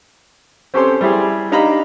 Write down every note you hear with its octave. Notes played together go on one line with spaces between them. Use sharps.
C4 C#4 G4 A4 C5 C6
G3 E4 G4 G#4
D4 D#4 G4 F5 A#5 B5